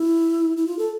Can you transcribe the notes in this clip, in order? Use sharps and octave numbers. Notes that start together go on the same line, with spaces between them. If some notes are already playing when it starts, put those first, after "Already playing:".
Already playing: E4
E4
F4
A4